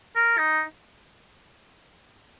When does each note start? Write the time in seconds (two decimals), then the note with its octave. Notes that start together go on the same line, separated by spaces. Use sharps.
0.16 A#4
0.38 D#4